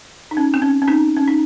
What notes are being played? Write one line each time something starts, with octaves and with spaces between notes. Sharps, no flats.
D#4
C#4
C4
C#4
C#4
C4 D#4
C#4
D#4